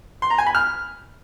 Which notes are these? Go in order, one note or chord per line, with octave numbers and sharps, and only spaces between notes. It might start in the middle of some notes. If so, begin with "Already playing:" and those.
C6
A#5
G#5
B5
F6